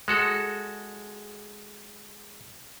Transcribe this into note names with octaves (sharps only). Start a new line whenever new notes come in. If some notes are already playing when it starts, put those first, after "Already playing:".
G#3 F#4 A4